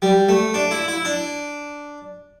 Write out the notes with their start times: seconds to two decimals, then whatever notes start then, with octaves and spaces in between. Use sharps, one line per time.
0.02 G3
0.29 A3
0.54 D4
0.71 E4
0.88 E4
1.05 D4